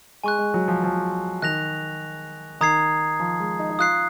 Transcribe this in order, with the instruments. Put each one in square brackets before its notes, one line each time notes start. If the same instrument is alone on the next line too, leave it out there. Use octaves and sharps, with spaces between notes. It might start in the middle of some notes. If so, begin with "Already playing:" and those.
[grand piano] G#3 [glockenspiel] G#5 C#6 F#6
[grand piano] G#3
F#3
F3
F3
[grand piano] D#3 [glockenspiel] F#6 A#6 F7
[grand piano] D#3 [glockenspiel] A#5 D#6 G#6 C7
[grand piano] F3
G#3
D#4
D#4
[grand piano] F4 [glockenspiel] D#6 F#6 C7